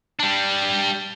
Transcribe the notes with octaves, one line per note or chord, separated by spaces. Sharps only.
G3 D4